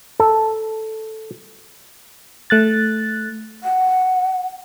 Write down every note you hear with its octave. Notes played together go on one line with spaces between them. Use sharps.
A4
A3 F#6 A6
F#5